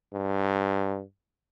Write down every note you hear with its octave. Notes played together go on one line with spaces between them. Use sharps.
G2